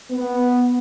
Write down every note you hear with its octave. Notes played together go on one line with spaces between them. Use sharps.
B3